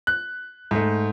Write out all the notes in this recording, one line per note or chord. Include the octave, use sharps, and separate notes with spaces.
F#6
G#2 A3